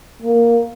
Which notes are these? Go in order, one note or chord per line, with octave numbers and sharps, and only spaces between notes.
A#3